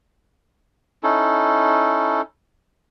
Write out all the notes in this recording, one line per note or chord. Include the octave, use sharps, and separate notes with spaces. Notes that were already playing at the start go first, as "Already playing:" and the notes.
C#4 D#4 E4 A4